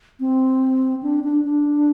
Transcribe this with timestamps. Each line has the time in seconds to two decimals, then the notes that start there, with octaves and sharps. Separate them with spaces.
0.20 C4
1.02 D4
1.24 D4
1.44 D4